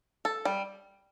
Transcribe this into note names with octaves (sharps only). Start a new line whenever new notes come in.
A4
G3